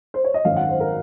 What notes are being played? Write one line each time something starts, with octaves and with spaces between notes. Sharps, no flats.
C5
C#5
D#5
G#1 F#2 D#3 F5
F#5
C5
A#4